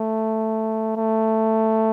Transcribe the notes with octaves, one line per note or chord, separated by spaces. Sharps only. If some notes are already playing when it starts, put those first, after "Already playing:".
Already playing: A3
A3